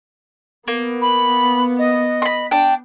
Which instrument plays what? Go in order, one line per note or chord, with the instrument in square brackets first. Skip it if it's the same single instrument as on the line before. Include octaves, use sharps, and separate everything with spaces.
[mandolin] A#3 [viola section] B3
[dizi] B5
D#5
[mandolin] B5 C6
D4 G5